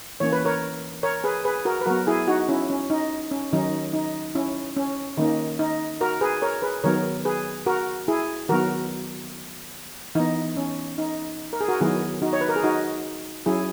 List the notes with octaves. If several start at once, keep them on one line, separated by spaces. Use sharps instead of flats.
E3 A#3 C#4 C#5
B4
A#4 C#5
A#4 C#5
G#4 B4
G#4 B4
F#4 A#4
B4
F#3 B3 F#4 A#4
E4 G#4
D#4 F#4
C#4 E4
C#4
D#4
C#4
D#3 F#3 C#4 D#4
D#4
C#4 E4
C#4
D#3 A#3 C#4 D#4
D#4
F#4 A#4
G#4 B4
A#4 C#5
G#4 B4
D#3 F#3 B3 A#4 C#5
G#4 B4
F#4 A#4
E4 G#4
D#3 F#3 B3 F#4 A#4
E3 B3 D#4
C#4
D#4
A#4
G#4
F#4 A#4
D#3 F#3 B3 E4 G#4
D#4 F#4
C#5
B4
A#4
G#4
D#4 F#4
F#3 C#4 E4 G#4